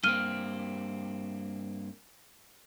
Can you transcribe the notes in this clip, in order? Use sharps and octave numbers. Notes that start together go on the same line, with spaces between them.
G2 A#3 C4 F6 D#7 G7